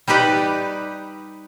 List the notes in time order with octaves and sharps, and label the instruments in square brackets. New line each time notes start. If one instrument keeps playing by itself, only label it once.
[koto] G3 D#4 G4 B4 D5